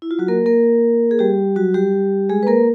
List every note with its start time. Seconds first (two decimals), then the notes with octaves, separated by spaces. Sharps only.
0.02 E4
0.11 F4
0.19 F#3 F#4
0.28 A#3 A#4
0.46 A#3 A#4
1.11 G#4
1.19 G3 G4
1.56 F#3 F#4
1.74 G3 G4
2.29 G#3 G#4
2.43 B4
2.47 A#3 A#4